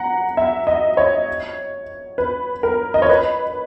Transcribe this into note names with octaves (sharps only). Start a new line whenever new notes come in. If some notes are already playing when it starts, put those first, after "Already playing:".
Already playing: F#5 A#5
E5
D#5
C#5
B4
A#4
D#5
C#5
B4